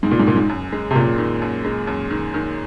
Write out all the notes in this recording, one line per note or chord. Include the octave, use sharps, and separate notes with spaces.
F#1 G#2
A#2
G#2
F#2 A#2
G#2
F#2
G#3
C3
F#2 A#2
D#3
F#2
G#3
F#2
D#3
D#3